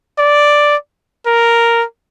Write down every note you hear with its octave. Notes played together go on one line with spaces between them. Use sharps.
D5
A#4